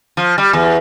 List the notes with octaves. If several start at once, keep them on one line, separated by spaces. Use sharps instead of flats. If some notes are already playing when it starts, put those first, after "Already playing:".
F3
G3
E2